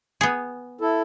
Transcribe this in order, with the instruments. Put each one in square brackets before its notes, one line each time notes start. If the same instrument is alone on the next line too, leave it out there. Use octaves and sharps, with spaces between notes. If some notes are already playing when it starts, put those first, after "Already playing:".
[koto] B3 G#4
[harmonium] E4 A4